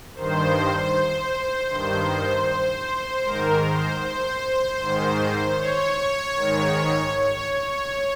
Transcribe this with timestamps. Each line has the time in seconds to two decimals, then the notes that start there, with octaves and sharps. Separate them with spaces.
0.15 G2 D#3 C5
1.70 G2 D#3
3.25 G#2 D#3 A#4
3.65 C5
4.03 C5
4.80 G#2 D#3
5.58 C#5
6.35 G#2 D#3
7.13 C#5
7.52 C#5